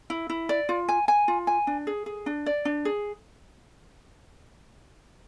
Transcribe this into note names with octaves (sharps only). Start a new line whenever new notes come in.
E4
E4
D5
F4
G#5
G#5
F4
G#5
D4
G#4
G#4
D4
D5
D4
G#4